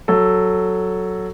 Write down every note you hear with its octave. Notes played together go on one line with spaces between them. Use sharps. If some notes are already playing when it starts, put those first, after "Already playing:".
F#3 A4